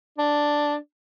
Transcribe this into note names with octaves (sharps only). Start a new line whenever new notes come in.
D4